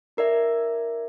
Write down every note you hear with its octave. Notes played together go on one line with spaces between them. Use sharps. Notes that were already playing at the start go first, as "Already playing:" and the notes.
D#4 A#4 D5 E5